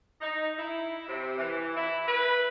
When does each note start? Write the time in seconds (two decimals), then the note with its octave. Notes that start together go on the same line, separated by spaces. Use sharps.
0.21 D#4
0.58 E4
1.08 C3
1.38 E3
1.76 E4
2.07 B4